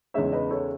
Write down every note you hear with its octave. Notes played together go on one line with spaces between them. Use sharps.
E2 C#3 G#3 D#4 C#5 E5
B4 D#5
A4 C#5